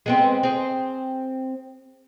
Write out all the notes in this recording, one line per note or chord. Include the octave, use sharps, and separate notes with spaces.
G#3 B3 C4
C4 G#4